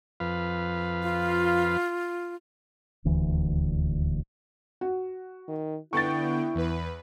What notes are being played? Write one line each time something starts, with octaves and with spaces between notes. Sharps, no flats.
F2 B4 F5
F4
D#1 D2 E3
F#4
D#3
D3 B3 E4 G5 C#6 A6
E2 B4